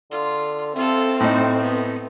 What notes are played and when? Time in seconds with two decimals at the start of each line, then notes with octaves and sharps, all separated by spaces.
0.11 D3 F4
0.76 A3 C4 F4 A4
1.20 A2 D#4 C5
1.59 B3